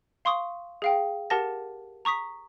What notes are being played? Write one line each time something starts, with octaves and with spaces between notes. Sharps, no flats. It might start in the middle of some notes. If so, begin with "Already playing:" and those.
F5 C6 C#6 D#6
G#4 F5 G5
G4 A#4 F#5 A5 A6 A#6
A#5 C#6 D#6 B6